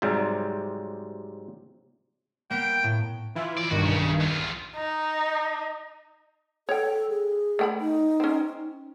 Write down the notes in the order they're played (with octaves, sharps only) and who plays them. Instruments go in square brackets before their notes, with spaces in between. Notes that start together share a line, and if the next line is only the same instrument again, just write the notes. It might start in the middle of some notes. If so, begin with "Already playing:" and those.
[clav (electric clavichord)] G#2 C3 F#3 G3
[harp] A#3 B3 [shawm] G5
[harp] A2
[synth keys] E3 E4 F4
[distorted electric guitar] F2 D5
[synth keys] B1 G2 D#3 [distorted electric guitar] F#4
[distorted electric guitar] C#3
E2 F4
[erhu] D#4
[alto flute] A4 [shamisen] C#5 G5
[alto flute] G#4
[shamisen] A3 G5 B5
[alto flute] D#4
[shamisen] C4 C#4